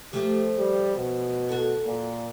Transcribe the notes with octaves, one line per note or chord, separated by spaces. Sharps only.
F3 A3 G4
G3
B2
F#4 A4
A#2